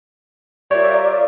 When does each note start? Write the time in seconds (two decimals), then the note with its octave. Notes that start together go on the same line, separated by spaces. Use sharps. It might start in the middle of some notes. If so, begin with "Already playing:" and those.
0.71 G3 F4 A#4 C#5 D5 E5